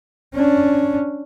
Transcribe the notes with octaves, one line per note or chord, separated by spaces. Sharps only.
C#4 D4